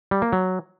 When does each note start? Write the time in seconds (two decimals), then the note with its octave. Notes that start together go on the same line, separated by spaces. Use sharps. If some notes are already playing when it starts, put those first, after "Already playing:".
0.11 G3
0.22 A#3
0.33 F#3